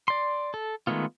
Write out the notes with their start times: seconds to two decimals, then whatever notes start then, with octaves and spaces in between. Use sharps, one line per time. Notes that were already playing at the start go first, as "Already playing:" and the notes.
0.08 D5 C6
0.54 A4
0.87 D#3 G#3 A3 B3 F4